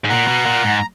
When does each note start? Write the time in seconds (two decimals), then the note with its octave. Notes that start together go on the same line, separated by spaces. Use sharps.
0.04 G#2
0.09 A#2 F#5 A#5
0.27 B2
0.45 A#2
0.64 G#2